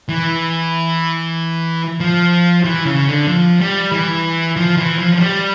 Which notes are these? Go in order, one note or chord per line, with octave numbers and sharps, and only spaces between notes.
E3
F3
E3
C#3
D3
F3
G3
E3
F3
E3
F3
F3
G3